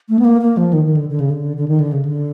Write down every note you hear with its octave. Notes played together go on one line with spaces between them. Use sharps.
A3
B3
A#3
A#3
F3
D#3
D#3
D3
D3
C#3
D3
D3
D#3
D3
C#3
D3